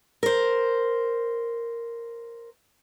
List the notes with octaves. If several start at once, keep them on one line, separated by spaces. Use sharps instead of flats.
A#4 C5